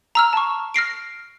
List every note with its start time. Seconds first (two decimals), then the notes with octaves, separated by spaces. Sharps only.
0.15 A#5 E6 F6
0.33 A5 C#6
0.74 F6 A#6 C7 D7